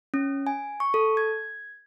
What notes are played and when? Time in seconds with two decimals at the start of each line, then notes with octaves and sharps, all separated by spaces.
0.14 C#4
0.47 G#5
0.80 C#6
0.94 A4
1.17 G#6